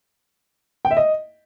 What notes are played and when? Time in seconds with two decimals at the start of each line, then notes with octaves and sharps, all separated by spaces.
0.85 G5
0.91 E5
0.97 D#5